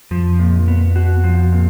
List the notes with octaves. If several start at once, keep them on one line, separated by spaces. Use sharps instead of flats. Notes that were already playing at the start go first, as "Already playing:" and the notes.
F2 F3
A#2
B3
F#4
F3
A#2